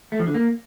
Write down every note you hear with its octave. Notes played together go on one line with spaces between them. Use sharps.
A3
F3
D3
A#3